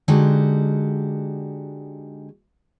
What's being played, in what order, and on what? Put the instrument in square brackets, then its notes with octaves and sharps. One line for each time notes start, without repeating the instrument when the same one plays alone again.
[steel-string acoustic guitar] D3 G#3 D#4 F#4 G4